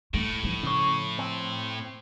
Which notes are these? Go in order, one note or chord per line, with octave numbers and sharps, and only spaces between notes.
A2 A3
F3
C#3 C#5
C4